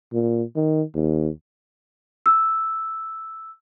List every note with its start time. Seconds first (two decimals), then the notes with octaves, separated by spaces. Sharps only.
0.13 A#2
0.56 D#3
0.95 D#2
2.26 E6